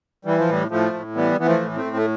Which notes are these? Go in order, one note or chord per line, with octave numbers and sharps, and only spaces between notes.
E3 G3
F3
A2 G3
A2 F3 A3
A2
E3 G3 B3
E3 B3
F3 A3
A2
A3 C4
A2
A3